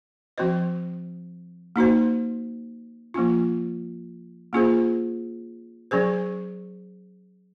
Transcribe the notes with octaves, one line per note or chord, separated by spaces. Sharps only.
F3 C4 F#4 C5 D#5
A#3 D#4 F#4 C5
F3 A#3 C#4 F4
A#3 C#4 F4 G#4 C5
F#3 C#4 G#4 C5